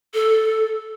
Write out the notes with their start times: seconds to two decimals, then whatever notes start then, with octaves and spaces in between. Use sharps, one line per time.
0.14 A4